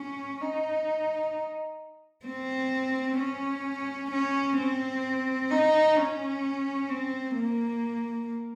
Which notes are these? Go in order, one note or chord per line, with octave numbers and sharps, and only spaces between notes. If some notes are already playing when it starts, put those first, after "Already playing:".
Already playing: C#4
D#4
C4
C#4
C#4
C4
D#4
C#4
C4
A#3